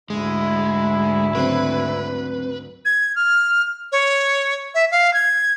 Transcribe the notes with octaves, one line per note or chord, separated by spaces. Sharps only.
D2 G#2 G#3 E4
C#3 F#3 C4 B4
G#6
F6
C#5
E5
F5
G#6